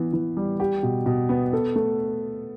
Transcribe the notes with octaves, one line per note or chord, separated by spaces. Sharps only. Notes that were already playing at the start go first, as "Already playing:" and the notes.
Already playing: E3 B3
E3
G3
G4
B2
B2
B3
A4
A3